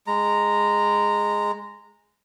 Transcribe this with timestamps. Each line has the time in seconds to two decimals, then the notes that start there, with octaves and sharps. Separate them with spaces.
0.07 G#3 A#5